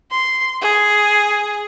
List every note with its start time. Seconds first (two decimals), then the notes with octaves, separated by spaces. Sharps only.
0.11 C6
0.61 G#4